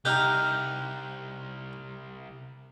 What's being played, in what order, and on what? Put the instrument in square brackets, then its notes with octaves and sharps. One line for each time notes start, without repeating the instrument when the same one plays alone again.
[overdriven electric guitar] C2 [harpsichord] D#4 G4 [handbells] A#5 F6 F#6